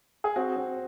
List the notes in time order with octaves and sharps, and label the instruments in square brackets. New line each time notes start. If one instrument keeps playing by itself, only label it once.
[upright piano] G#4
C4 F#4
C4